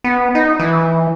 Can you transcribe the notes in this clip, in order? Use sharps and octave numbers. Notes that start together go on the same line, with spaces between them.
B3
D#4
E3